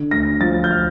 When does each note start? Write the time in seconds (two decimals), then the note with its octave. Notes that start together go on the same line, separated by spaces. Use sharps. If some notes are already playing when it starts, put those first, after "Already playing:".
Already playing: D3
0.11 D2 A#6
0.41 F3 A6
0.64 G6
0.71 F6